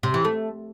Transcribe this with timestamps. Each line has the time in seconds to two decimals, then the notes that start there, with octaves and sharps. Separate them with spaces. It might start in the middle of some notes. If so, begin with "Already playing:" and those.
0.03 C3
0.14 E3
0.25 A3